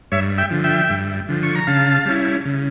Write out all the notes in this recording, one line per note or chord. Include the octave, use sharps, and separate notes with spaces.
G2 C#5 E5
E5 G5
D3 F3
E5 G5
G2
D3 F3
C#6
A#5
C#3 F5 A5
G3 C#4 E4
C#3